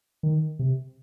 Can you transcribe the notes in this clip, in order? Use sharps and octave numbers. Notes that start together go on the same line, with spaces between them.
D#3
C3